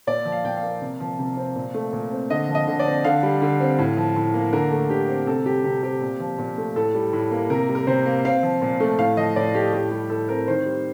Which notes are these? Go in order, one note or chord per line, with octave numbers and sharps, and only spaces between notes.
A#2 D5
F3
F5
A#2 G5
F5
A#3
C3
F3
C3
C4
A#2
A3
A#2
C4
D3 D#5
F3
D#5
D3
D5
C4
D3 F5
G3
D3
C4
A2
F3
A2
A#3
D3 A#4
A3
D3 G4
C4
C3 A4
G3 G4
C3 G4
C4 G4
A#2
F3
A#2
A3
A2 A4
G3
A2
A#3
C3 A#4
G3
A#4
C3 C5
A#3
C4 F5
F3
A#2
A3
A2 F5
F3 D#5
A2 D5
A3 G4
A2 G4
G3
A2 A4
C4 A#4
D#3 C5
G3